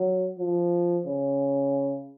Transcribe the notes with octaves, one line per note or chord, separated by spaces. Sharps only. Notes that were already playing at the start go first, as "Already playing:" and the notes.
Already playing: F#3
F3
C#3